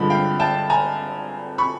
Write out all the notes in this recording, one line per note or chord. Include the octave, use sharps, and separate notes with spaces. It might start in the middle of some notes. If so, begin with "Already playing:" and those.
Already playing: G2 D3 F3 G#3 B5
F5 G5
G5 A5
G#5 A#5
B5 C#6